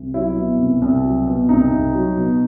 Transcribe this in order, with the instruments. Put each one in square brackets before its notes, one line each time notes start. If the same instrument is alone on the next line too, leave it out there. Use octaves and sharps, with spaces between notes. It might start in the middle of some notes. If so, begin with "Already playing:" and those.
Already playing: [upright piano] C2
F#3 E4
B2
C2
C2
F#3
B2
C2 D#4
C2
F#3
B2